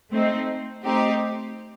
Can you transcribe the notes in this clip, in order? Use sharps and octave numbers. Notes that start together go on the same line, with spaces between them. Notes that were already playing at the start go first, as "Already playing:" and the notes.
A3 C4 D#4
A3 C4 D#4 G4